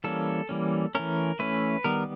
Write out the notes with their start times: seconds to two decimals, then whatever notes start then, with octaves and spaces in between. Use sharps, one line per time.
0.04 E3 G3 A#3 C#4 A4
0.49 E3 G3 A#3 C#4
0.95 E3 A3 C#4 A#4
1.39 E3 A3 C#4 B4
1.84 D#3 G3 B3 A#4